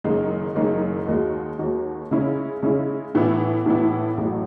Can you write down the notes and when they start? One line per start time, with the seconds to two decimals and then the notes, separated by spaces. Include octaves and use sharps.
0.04 F#1 F#2 D#3 G#3 D#4
0.55 F#1 F#2 D#3 G#3 D#4
1.07 D#2 D#3 G#3 D#4 F#4
1.59 D#2 D#3 G#3 D#4 F#4
2.11 C#3 G#3 C#4 E4
2.62 C#3 G#3 C#4 E4
3.15 A2 E3 B3 E4
3.66 A2 E3 B3 E4
4.17 A1 A2 F#3